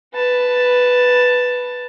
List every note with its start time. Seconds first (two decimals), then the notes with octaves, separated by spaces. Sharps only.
0.15 B4 A5